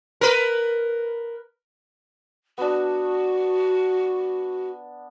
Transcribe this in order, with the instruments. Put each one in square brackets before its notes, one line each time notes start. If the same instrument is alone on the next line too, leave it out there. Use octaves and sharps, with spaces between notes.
[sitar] A#4 B4
[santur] B3 D4 [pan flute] F#4